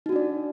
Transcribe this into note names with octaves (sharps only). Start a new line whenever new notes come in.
D4 D#4 F#4 D5